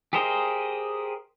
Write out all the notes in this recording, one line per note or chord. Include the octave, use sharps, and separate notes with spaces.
G4 G#4 A#4 C5 D#5